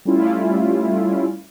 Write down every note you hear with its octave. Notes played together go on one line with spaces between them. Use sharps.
G3 A3 C#4 E4 F4